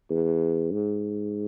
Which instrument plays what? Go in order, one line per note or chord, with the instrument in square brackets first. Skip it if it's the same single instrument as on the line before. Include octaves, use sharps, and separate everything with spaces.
[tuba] E2
G#2